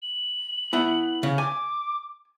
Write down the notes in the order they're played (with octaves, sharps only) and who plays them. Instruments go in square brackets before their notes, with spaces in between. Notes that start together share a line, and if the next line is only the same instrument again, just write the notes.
[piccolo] F#7
[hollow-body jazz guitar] B3 E4
C#3
[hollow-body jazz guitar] G#5 [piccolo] D6